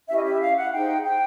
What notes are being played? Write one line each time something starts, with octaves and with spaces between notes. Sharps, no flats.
C#4 E4 G4 E5
D#5
E5
F5
F#5
D#4 G#4 C5 G5
G5